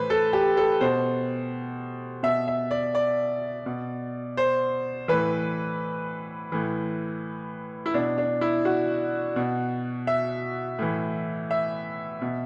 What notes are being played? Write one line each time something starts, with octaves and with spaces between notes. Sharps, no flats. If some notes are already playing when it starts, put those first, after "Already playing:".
Already playing: A2 E3 B4 C5
A4
G4
A4
B2 C5
B2 E5
E5
D5
D5
B2
C5
A2 E3 B4
A2 E3
E4
B2 D4
D4
E4
F#4
B2
E5
A2 E3
E5
B2